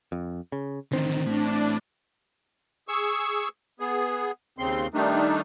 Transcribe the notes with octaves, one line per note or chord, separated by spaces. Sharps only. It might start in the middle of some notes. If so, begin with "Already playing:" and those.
F2
C#3
A1 D3 D#3 C4
A2 D4
G#4 C#6 E6
B3 G#4
D#2 C#3 C4 C6
D#3 G3 A3 D4 D#4